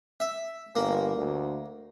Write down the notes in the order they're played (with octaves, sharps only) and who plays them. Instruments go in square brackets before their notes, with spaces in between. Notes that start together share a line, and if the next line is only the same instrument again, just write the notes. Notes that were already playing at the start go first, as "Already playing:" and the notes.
[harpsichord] E5
[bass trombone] G1 [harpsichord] A#3
[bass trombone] D2